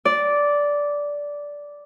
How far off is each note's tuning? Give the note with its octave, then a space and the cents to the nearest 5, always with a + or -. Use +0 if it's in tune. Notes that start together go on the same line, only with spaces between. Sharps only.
D5 -10